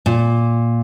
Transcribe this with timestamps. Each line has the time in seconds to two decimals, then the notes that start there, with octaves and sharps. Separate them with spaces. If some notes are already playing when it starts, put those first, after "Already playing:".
0.06 A#2